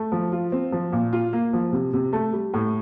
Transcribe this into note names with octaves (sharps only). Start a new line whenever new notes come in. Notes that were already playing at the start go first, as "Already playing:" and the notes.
Already playing: A3
F3
F4
C4
F3
A#2
F4
A#3
F3
C3
C3
A3
G3
A2